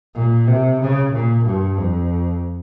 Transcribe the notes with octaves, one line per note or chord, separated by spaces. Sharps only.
A#2
C3
C#3
A#2
G2
F2